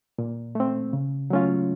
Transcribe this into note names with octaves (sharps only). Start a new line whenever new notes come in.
A#2
A3 C4
C#3
F#3 A3 C#4 F4